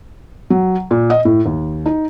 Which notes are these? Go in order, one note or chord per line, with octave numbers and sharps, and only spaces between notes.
F#3
A#2
D#5
A2
D#2
D#4